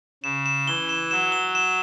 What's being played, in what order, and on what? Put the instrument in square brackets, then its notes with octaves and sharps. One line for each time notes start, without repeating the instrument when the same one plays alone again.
[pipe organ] C#3 [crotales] E7
[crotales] E7
[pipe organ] E3 [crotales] G7
[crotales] E7
[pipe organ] F#3 [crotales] E7
[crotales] G7
E7